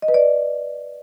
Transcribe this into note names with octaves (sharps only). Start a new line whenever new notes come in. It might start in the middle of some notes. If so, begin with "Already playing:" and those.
D#5
B4
D5